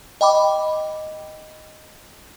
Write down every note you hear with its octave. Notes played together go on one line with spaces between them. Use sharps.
D#5 G5 B5 D6